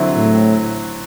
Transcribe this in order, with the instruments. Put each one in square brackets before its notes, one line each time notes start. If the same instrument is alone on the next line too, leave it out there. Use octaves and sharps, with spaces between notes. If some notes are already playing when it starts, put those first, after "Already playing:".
Already playing: [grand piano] D3 F#3 C4 E4
[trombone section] A2